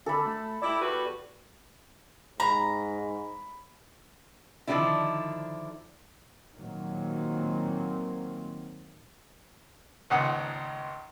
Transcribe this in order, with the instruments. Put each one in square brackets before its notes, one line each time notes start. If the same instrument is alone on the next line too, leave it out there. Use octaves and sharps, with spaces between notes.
[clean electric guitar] D3 [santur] A4 B5
[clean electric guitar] A3
[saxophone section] E4 [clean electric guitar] G4 D5
[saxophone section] E2 F#4 B4
[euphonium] G#2 [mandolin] A#5 [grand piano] B5
[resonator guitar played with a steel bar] D3 D#3 F3 G#3 D4 E4
[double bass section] A#2 D#3 F#3 A#3 C4
[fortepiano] G#1 C#2 A#2 F#5 D#6